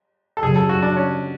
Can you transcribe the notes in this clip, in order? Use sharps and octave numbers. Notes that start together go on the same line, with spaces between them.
A4
F#2 C#3 F#3 G#4
A4
F#4
D4
C#4